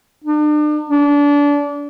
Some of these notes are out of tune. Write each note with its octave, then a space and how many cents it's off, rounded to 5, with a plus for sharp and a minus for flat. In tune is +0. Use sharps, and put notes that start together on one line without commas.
D4 +40
D4 -25